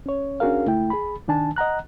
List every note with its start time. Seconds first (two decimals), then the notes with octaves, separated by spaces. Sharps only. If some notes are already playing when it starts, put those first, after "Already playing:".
0.06 C#4 C#5
0.40 C#4 D4 F#4 G#4 A#4 F5
0.66 C#2 A3 E4 G5
0.90 G#4 B5
1.28 C2 D#3 D4 G#5 A5
1.56 D#5 F#5 A#5 F#6